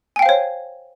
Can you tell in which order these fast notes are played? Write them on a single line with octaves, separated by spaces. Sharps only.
G#5 G5 F5 C5 C#5